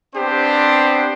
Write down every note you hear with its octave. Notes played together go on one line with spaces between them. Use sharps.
B3 C4 D4 G4 C5